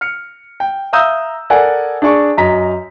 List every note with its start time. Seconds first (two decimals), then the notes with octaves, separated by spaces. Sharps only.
0.01 F6 C#7
0.60 G5
0.93 E5 F5 A#5 D#6 E6 G6
1.50 A4 A#4 D5 F#5 G#5
2.02 D4 G#4 D5 C#6
2.37 F#2 D#5 A#5 B6